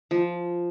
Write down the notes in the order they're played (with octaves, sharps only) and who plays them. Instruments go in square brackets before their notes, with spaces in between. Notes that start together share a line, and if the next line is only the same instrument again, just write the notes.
[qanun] F3